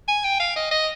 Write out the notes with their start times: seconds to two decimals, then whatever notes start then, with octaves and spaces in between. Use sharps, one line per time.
0.08 G#5
0.24 G5
0.40 F5
0.56 D#5
0.71 D#5